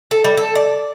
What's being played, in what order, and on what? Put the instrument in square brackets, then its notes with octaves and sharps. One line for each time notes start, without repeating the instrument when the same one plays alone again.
[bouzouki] A4
G3
A4
D5